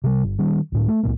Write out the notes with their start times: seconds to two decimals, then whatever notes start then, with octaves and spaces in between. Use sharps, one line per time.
0.04 C3 G3
0.23 G1
0.39 D#3 G3 C#4
0.72 C#2 A2
0.88 A3
1.03 C#2 A#2 A#3